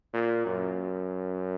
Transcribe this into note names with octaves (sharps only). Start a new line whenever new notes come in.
A#2
F#2